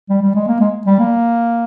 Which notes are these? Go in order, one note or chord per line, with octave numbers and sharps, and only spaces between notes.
G3
G3
G#3
A#3
G#3
G3
A#3